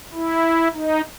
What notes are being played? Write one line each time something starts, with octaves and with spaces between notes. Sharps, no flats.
E4
D#4